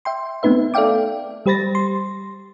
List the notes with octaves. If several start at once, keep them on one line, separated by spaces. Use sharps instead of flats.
E5 G5 C6
A3 B3 C4 D#4 B4 E5
A4 D5 E5 F5 G5 D6
G3 G4 C5 B5 A6 A#6
C6